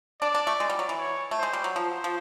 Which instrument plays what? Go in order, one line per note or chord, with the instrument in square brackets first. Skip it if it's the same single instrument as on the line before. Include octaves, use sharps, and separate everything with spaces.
[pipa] D4 [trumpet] D5
[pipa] D4
A3
G#3
G3
F#3
E3
[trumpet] C#5
[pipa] A3
[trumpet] C5
[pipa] G#3
G3
F#3
[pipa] F3 [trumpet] C5
[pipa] F3